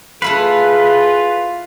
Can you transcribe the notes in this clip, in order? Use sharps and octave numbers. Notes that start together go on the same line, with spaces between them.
A3 E4 F4 G#4 B4 F5